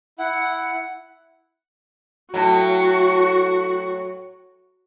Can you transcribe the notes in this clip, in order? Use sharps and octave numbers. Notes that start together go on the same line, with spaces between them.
E4 F#5
A2 F#3 F#4